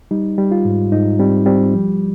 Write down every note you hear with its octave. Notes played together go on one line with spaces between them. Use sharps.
G3 D#4
G3
F4
G#2
G#2 D#4
G3 C4
G3 C4
F3